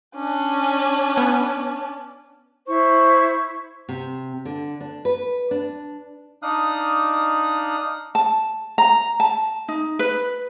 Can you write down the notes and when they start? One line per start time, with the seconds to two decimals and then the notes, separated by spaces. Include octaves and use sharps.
0.15 C#4 D4
1.16 B3 G#5
2.67 E4 C5 C#6
3.89 C3
4.45 D3
4.81 D4
5.05 B4
5.51 D4
6.43 D4 D#4 F5 D#6 F#6
8.15 A5
8.78 A#5
9.20 A5
9.68 D#4
9.99 B4